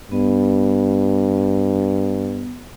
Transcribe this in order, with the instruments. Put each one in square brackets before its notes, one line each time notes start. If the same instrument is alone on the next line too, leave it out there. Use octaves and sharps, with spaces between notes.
[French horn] G2 [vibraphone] B3